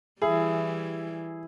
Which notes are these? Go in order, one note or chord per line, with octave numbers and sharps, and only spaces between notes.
E3 G3 E4 G#4